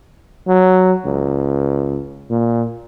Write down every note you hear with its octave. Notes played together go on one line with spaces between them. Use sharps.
F#3
C#2
A#2